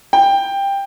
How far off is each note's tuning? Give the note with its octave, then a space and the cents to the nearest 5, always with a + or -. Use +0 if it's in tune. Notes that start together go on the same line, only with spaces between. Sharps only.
G5 +15